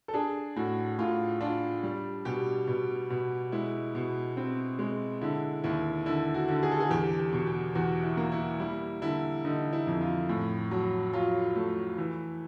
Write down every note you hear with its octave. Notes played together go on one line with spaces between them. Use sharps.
A4
D4 G#4
A2 F#4
A2 F4
D4 F4
G3
B2 G4
B2
B2
G#3 E4
B2
C4
G#3
D3 E4
D#2 E4
D3 E4
F#4
D3
G#4
A4
G#4
E2 G4
G4
B2
G4
E2 F#4
E4
A#3
E4
G3 E4
D3 E4
D3 D#4
E4
F2
F4
A2
F#3
F#3 F4
A3
E3